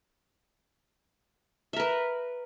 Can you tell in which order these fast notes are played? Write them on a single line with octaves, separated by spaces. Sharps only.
E5 A#4 B4